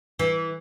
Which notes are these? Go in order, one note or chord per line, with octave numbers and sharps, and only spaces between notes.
E3